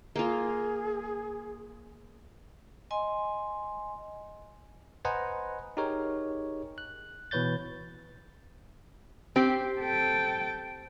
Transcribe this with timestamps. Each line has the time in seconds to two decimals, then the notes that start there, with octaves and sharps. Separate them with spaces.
0.16 A#3 F4 G#4
2.91 D#5 G#5 C6
5.05 B4 C5 D#5 F#5 G#5 A#5
5.77 D#4 G4 G#4 A#4 C#5
6.78 F#6
7.31 B2 E3 B4 C#5 G6 A6
9.36 C4 G4
9.80 A4 G5